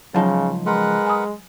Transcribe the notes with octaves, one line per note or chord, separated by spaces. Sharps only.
C#2 C#3 F3 F#3 D#4 A5
G#3 A#4 B4 F#5 C6
G#5 B5 D#6